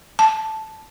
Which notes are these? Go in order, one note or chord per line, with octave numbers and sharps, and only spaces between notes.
A5